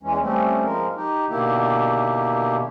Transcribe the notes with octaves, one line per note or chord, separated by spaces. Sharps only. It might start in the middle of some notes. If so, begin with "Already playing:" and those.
E2 E3 G#3 C#4
G3 A3 C4 C#4
F3 G#3 A#4
D#4 G4
B2 D3 D#3 A#3 E4 G4